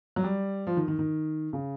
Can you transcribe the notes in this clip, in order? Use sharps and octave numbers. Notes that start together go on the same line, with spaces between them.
F#3
G3
F3
D#3
D#3
D#3
C#3